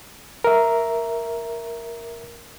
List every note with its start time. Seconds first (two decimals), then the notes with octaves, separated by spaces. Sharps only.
0.44 A#4 E5